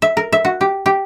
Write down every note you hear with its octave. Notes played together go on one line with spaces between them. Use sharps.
E5
A#4
E5
F#4
G4
G4